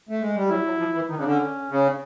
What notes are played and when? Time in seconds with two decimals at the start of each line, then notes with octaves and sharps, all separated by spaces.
0.09 A3
0.22 G#3
0.36 G3
0.50 F#3 E4
0.65 F#3
0.79 F3
0.95 E3
1.10 D#3 D#4
1.17 C#3 D4
1.24 D3 C#4
1.70 C#3